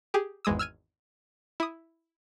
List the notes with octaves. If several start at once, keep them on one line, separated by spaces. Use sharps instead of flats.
G4 G#4
G#1 E2 G#3 D#6 E6
E6 F6 G#6 D#7
E4 D#6